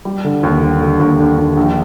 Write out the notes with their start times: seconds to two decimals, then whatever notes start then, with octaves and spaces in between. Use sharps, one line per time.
0.05 G3
0.25 D3
0.43 D#2
0.62 D3
0.81 D3
0.99 D#2
1.19 D3
1.38 D#2
1.57 A#1